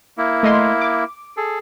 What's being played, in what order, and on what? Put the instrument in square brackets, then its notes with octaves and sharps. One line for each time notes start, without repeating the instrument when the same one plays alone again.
[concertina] A#3 E4
[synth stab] A3 D#5 C6
D6
[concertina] G#4 A4